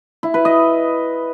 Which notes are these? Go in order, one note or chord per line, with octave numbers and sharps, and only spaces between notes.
E4
B4
D#5